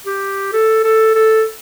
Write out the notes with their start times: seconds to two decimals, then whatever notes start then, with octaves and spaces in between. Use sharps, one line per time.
0.06 G4
0.53 A4
0.84 A4
1.15 A4